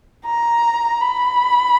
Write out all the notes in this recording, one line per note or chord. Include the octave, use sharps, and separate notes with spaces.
A#5
B5